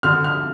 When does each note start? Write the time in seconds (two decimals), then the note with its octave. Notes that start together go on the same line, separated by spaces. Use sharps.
0.03 D3 F6
0.24 F6